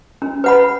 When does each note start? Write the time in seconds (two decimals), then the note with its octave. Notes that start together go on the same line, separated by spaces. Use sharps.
0.22 C#4
0.44 B4 F#5 B5